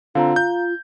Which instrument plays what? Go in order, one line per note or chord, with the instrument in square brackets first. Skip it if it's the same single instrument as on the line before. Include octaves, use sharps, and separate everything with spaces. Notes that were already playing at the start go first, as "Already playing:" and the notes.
[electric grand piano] D3 C4 [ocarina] F4 [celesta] F5 A#5
[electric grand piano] G6